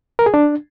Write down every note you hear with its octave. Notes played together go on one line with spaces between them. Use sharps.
A#4
G#4
D4